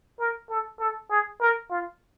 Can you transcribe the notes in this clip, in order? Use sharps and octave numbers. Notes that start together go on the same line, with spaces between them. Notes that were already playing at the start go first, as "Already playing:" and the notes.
A#4
A4
A4
G#4
A#4
F4